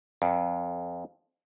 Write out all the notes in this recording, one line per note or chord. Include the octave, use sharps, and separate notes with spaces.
F2